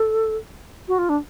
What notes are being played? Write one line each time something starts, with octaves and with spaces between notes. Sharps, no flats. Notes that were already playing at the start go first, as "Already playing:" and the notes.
Already playing: A4
F#4
F4
D4